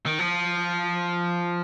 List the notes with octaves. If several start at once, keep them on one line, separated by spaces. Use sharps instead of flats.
D#3
F3